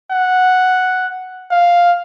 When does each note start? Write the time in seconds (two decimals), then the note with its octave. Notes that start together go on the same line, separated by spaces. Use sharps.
0.11 F#5
1.51 F5